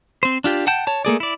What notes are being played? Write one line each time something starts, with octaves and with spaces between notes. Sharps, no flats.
C4 C5
D4 F4 G4
F#5 G5 A5 G6
C#5 A5
A3 A#3 G#4 D5
E4 D5